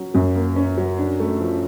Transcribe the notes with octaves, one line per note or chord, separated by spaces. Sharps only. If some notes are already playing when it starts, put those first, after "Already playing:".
Already playing: F#3 C#4
F#2 F#3
A#3
C#4
F#3
D4
A3
F3